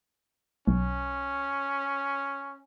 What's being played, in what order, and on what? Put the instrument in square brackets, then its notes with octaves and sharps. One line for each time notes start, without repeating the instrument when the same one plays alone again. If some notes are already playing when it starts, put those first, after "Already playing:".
[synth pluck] B1 [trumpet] C#4